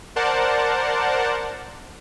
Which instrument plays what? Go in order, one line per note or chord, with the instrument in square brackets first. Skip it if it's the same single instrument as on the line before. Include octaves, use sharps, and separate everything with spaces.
[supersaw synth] A#4 C5 D5 F#5 A5